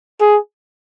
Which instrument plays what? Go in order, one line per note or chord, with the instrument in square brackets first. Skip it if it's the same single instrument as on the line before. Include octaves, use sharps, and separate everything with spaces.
[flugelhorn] G#4